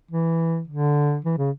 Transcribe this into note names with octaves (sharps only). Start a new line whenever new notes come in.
E3
D3
E3
C#3